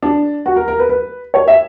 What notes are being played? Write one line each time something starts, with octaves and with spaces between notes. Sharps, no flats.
D4
F#4
A#4
A#4
B4
B4
C#5
E5